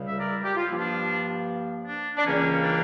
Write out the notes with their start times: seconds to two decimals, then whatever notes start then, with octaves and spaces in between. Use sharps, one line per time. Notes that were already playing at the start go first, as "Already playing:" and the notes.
Already playing: C#2 C#3 G3
0.08 E5
0.19 A#4 D5
0.45 G4
0.56 F4
0.67 G2 F3 A#3 E4
0.78 D4 F4
1.86 D4
2.16 D4
2.25 C#2 C#3 E3 G3 A#3 C#4
2.63 D4